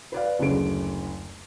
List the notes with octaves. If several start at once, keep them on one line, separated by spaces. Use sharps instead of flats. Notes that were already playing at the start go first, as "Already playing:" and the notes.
B4 D5 F5
F#1 D2 C#3 D7